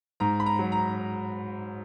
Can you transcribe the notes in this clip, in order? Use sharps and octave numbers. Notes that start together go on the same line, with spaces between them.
G#2 A#5
B5
A#5
F#3
A#5